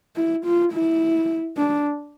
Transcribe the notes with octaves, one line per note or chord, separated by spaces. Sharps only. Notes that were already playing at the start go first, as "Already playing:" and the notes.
E4
F4
E4
D4